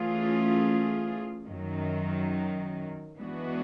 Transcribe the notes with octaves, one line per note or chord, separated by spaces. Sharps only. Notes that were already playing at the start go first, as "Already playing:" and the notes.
Already playing: E3 A3 C#4 F4 G#4
F#2 D#3 F#3
E3 G#3 B3 D4 F#4